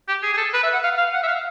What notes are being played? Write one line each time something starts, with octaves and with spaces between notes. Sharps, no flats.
G4
G#4
G#4
A4
B4
E5
F#5
F5
F5
F#5
E5
F5